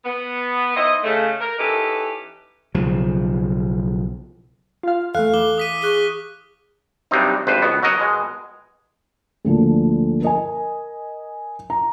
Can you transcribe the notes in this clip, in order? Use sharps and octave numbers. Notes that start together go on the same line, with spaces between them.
B3
D#4 E4 C5 D#5
C#3 A3
A#4
E3 C#4 D#4 G4 A4 B4
B1 C#3 F3
F4 F5
E2 A3 A4 F5 F#6
E3 D6 G7
D#6 B6 D#7
G#4 C#6 F#6 G7
G2 C3 F#3 G3 C4 D#4
G#1 G2 B4 C5
C#2 B2 B3
F#3 F#4 A#4 D#5
B2 G#3
D2 A#2 D3 F3
A#4 D#5 G#5
A#5